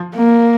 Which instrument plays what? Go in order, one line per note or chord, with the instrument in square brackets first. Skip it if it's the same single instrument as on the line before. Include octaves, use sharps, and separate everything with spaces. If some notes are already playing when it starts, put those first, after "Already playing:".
Already playing: [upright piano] F3
[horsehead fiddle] A#3